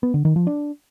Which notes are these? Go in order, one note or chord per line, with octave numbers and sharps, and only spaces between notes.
B3
D3
D#3
F3
D4